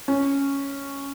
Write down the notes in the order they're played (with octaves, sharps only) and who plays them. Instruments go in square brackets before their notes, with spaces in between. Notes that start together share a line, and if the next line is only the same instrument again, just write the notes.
[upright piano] C#4